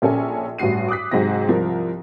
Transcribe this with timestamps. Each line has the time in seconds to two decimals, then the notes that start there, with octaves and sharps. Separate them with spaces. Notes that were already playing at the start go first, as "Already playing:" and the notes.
0.02 A#1 C#4 A4 G#5
0.58 A1 G2 F#4 C7 D#7
0.89 D6 D#6 F#6 B6
1.11 G#2 C3 F#3 C4 A#6
1.48 C2 F3 A#4